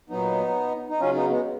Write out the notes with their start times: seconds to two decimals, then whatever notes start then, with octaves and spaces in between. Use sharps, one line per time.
0.09 A#2 F#3 B3 D#4
0.89 D#4
1.00 C#3 F#3 C#4 F4
1.15 B3 D#4
1.30 G#3 B3